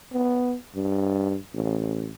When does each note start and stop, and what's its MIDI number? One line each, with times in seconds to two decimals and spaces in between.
0.13 0.55 59
0.75 1.36 43
1.54 2.11 33